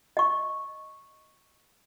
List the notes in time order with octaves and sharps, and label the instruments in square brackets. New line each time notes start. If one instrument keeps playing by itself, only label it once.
[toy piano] D#5 C#6